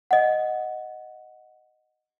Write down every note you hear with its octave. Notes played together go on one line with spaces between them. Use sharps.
D#5 F#5